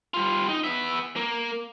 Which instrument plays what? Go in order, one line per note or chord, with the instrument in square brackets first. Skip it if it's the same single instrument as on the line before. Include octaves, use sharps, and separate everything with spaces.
[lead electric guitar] G3 F4
D#4
B3 E5
A#3